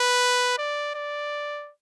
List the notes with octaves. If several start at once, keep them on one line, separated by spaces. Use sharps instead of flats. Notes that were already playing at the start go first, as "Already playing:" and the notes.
Already playing: B4
D5
D5